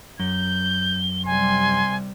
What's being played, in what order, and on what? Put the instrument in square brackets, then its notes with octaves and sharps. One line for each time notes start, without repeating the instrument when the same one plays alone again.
[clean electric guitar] F#2 [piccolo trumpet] G6 [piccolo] G7
[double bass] C3 G3 [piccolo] G#5 [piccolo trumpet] C6